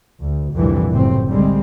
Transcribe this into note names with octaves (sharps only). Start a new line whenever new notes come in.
D2
C2 F2 A#2 D3 E3 G3
F#1 A2 C3 C4
C2 D3 G3 G#3 C4